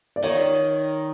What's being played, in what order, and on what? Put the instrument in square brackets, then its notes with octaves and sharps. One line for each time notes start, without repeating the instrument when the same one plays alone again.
[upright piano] D5
[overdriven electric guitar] D#3 [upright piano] C#5